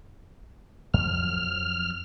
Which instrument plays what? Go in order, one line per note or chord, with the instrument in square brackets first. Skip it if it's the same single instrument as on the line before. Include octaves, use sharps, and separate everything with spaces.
[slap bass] F2 F3 F#3 [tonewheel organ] F6